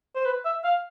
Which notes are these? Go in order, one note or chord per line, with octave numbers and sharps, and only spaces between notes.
C5
B4
E5
F5